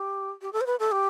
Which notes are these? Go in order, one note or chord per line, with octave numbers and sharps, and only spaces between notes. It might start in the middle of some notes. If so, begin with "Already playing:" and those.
Already playing: G4
G4
A4
C5
B4
A4
G4